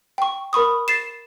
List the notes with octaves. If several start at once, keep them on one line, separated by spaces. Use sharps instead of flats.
G5 C#6
A#4 B5 C#6 D#6
A6 C7 E7